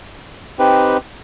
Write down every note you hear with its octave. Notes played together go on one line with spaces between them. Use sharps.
C4 D#4 G4 B4